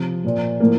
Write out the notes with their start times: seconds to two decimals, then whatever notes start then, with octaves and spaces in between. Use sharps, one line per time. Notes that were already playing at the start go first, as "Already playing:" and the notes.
Already playing: C3 F3
0.24 A#2 F3
0.60 A2 F3 A#3